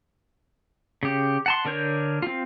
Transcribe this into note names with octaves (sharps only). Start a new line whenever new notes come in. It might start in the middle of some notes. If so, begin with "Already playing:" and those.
C#3 G4
F#5 A5 C6
D3 D4 A#4 C#5 G6
C4 F4